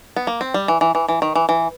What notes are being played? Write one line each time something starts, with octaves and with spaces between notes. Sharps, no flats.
B3
A#3
C4
G3
E3
E3
E3
E3
D#3
E3
E3